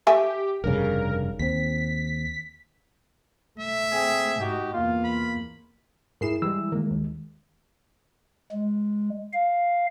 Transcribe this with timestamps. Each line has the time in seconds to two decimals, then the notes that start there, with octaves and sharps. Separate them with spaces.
0.07 A3 G4 E5 G#5
0.64 F1 G2 C#3 A#4
1.39 D#2 C4 B6
3.60 A3 E5
3.92 C4 G#4
4.39 G#2 D#4 F#4 G4
4.74 E2 A#3 F4
5.05 B5
6.21 G#2 E4 G#4 A#4 C7 E7
6.42 E3 G3 G#3 E6
6.72 D#3 G#3 A#3
6.91 D#2
8.52 G#3
9.33 F5